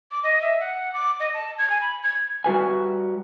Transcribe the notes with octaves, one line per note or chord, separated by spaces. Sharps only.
D6
D#5
E5
F#5
D6
D#5
A5
G#6
G#5
B5
G#6
G3 F#4 B4 G#5